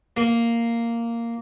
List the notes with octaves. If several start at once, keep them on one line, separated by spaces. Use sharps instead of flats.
A#3